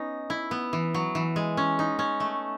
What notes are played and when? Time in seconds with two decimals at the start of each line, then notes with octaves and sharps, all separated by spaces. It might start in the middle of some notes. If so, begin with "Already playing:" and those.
Already playing: B3 C#4 D#4
0.30 E4
0.51 B3
0.73 E3
0.94 F#3
1.15 E3
1.36 G#3
1.57 C#4
1.79 D#4
1.99 C#4
2.20 A3